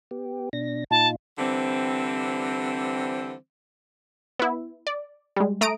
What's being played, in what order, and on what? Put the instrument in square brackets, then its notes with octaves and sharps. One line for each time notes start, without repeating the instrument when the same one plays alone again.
[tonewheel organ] B3 G4
B2 D4 A#6
[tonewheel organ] A#2 D#4 F4 [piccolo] A5
[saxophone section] D3 E3 G3 C4
[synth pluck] B3 E4
D5
G3 G#3
A3 A#5 D#6 D7